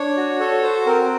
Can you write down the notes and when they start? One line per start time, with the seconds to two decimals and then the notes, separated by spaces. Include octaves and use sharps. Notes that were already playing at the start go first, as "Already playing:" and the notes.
Already playing: D4 C#5
0.17 F#4
0.40 A4 C#5
0.63 F#4 C5
0.86 C4 A#4